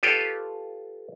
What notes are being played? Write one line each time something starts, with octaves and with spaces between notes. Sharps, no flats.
F4 G4 A4 B4 C#5 G5